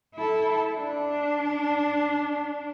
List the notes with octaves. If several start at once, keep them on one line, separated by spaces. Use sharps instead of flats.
E4 A4
D4